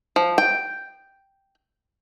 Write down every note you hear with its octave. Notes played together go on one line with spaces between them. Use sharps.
F3
G5